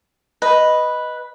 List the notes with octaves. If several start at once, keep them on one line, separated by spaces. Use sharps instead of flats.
B4 D#5